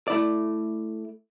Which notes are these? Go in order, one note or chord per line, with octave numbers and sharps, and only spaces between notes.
A3 E4 D5